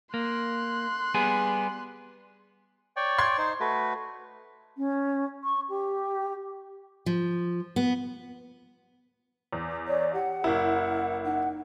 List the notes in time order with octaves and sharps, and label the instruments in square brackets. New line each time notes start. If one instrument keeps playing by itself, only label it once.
[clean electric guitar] A#3 [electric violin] C6 F#6
[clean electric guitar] G3 B3 G#4
[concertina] C#5 D5 G5
[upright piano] C6 G#6
[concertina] D#4 C5
A3 F#4 B4
[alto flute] C#4
C#6
G4
[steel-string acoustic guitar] F3
B3
[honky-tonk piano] E2
[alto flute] C#5 [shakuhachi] D5
[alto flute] G4 [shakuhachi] F#5
[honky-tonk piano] F#1 E4 [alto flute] A#4
[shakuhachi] D#4 [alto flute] F#5